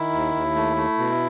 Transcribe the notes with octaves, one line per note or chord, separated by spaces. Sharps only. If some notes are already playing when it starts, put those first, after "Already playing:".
Already playing: D#3 E4
D#2
D#2
A3
A3
B2